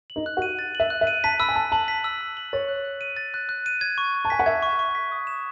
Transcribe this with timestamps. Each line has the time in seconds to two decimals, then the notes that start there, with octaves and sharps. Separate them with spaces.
0.10 F#7
0.16 D#4
0.26 F#6
0.37 F#4
0.42 D#7
0.59 A6
0.75 E5 F#7
0.90 F#6
1.01 E5
1.07 D#7
1.24 A5 B6
1.40 B5 E6
1.48 G#5
1.56 A5 E6
1.72 A5 F#7
1.88 B6
2.04 E6
2.21 E6
2.37 F#7
2.53 C#5 A6
2.68 F#6
2.85 F#6
3.01 D#7
3.17 A6
3.34 F#6
3.49 F#6
3.66 D#7
3.81 G#6
3.98 C#6
4.15 C#6
4.25 A5
4.30 G#5 B6
4.39 F#5
4.46 E5 G#6
4.62 C#6
4.79 C#6
4.95 B6
5.12 D#6
5.27 E7